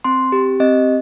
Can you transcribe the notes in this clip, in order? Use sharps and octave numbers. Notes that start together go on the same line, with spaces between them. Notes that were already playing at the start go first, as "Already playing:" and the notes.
C4 C6
G4
C4 D#5